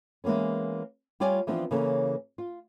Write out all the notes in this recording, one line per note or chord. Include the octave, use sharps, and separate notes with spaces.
E3 G#3 A#3 B3 C#4
G3 F4 C#5 D5 G#5
E3 F3 B3 C4 D4
C#3 E3 A#3 C#4 A4
F4